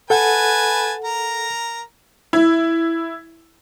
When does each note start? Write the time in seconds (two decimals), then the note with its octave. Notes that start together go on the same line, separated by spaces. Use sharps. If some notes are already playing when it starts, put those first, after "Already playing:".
0.10 A4 B4 F#5 G#5 A5
1.04 A#4 A#5
2.33 E4